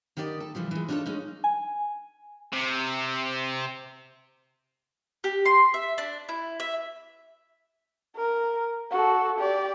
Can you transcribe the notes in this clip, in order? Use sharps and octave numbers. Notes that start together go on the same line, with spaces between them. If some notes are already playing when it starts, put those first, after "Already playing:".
D#3 B3 G4 D5 D#5
A4
C3 E3 F3 G3
E3 G#3
D4 D#4 F4 F#4 A4 C#5
G#3 C#4 D#4
G#5
C3
G4
C6
E5
D4
E4
E5
A#4
F#4 A4
G4 D5